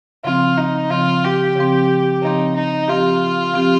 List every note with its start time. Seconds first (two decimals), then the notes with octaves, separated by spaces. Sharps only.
0.25 C#3 F3 C4 F4
0.57 D#4
0.90 C#3 F3 C4 F4
1.24 G4
1.56 C#3 F3 C4
2.22 C#3 F3 C4 D#4
2.55 D#4
2.88 F3 C4 F4 G4
3.54 F3 C4 G4